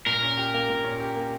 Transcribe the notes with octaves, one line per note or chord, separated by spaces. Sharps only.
A#2 A#4
C#4
G4
A#3
A#2
C#4
G4
A#3